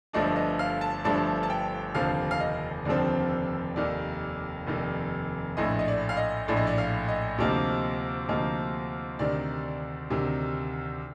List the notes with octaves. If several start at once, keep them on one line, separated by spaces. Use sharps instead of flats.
G1 G2 F3 A3 D4 D#5
D#5
F5
A5
G1 G2 F3 A3 D4 A5
A5
G5
F1 D#2 D3 F3 C4 F5
F5
D#5
F1 D#2 D3 F3 C4 D5
F1 D#2 D#3 D5
F1 D#2 D#3
A#1 A2 A3 D#5
D#5
D5
F5
D#5
A#1 A2 A3 D5
D#5
D5
F5
D#5
D2 C3 F3 A#3 D#4
D2 C3 F3 A#3 D#4
D2 C3 D#3 D5
D2 C3 D#3